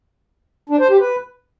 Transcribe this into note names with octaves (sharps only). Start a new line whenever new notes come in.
D4
C5
G4
B4